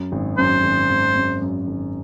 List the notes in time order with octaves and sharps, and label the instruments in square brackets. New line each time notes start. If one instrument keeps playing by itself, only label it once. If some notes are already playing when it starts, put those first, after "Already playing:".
Already playing: [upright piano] F#2
G#1
[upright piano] F#2 [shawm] C5
[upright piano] G#1
G#1
F#2
F#2
G#1